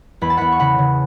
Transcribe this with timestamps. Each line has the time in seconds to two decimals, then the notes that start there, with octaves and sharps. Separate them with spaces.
0.21 E2 B5
0.30 A5
0.37 E2 F#5 B5
0.52 C#6
0.59 C#3 F#5 B5
0.79 C#3